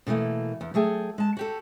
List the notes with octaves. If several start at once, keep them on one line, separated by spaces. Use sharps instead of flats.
B2 D3 E3 A3 A#3
E2
F#3 A3 G#4 G5
G#3 A5
F#4 G4 A4